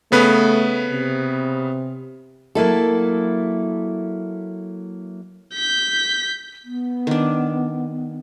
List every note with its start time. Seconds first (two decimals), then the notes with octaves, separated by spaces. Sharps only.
0.12 C#3 A3 B3 B4
0.90 C3
2.55 F#3 A#3 E4 A4
5.54 G6 B6
6.64 B3
7.07 D#3 D4